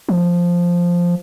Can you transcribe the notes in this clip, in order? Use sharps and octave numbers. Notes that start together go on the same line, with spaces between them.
F3